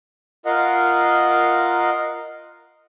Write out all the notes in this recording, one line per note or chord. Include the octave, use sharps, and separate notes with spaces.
F4 A#4 D#5 F5 F#5